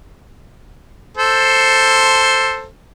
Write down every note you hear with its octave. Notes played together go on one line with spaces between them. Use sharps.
A4 C5